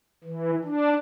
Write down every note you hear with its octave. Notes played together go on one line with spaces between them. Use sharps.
E3
D4